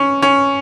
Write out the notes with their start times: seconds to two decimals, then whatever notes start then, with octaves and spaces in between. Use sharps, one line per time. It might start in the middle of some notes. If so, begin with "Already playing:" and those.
Already playing: C#4
0.22 C#4